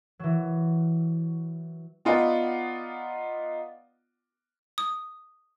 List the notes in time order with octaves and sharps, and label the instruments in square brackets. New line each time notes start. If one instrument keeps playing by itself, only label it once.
[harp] E3 F#3
[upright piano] B3 D#4 F4 D5 F#5
[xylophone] D#6